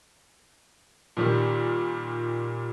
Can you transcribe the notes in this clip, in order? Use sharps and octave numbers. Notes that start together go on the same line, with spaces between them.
A#2 D#3 G3 A#3